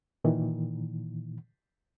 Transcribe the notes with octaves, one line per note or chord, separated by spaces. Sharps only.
A#2 D#3 E3